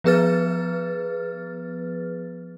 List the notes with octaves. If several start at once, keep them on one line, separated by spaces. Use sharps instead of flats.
F3 B3 G#4 B4 F6 A6